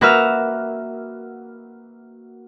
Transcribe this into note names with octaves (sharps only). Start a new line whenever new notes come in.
A#3 F#4 B4 E5 F6